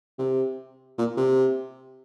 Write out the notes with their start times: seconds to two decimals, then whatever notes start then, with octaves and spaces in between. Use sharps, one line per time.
0.19 C3
0.98 A#2
1.17 C3